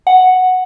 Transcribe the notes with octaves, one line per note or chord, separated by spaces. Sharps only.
F#5